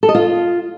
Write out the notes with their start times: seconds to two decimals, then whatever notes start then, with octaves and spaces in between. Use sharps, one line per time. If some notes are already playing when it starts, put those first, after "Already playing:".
0.03 A4
0.09 D#5
0.15 F4